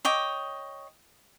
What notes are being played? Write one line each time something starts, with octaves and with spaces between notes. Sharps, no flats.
C#5 D#5 G5 D6